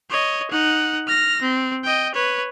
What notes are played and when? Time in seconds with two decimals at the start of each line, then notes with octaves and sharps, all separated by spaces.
0.10 C#5 D#5
0.51 D#4 F#5
1.07 F6 A#6
1.42 C4
1.84 D#5 G5
2.14 B4 C#5